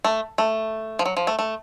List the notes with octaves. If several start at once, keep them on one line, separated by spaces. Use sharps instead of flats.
A3
A3
F3
F#3
F3
A3
A3